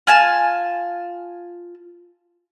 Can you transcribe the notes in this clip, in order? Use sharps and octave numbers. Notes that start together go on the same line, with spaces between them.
F4 G#5 A5